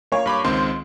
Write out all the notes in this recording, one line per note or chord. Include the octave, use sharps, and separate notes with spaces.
A#3 C#5
G2 B5 D6
C#2 D#3 C4 C6